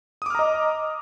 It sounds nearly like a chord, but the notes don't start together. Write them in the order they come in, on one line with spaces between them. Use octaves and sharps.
D#6 D6 F6 A#5 D#5